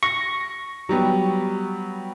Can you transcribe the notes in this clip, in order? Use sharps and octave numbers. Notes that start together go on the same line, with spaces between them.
C#6 A#6
F#3 G3 B3